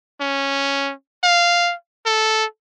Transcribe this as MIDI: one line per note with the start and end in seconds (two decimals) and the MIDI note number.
0.21 0.92 61
1.23 1.74 77
2.06 2.45 69